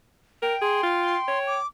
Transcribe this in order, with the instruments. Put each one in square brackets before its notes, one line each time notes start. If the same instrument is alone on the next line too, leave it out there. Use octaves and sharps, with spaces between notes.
[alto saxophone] A#4 [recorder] G5
[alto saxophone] G#4 [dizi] C6
[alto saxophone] F4
C#5
[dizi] D6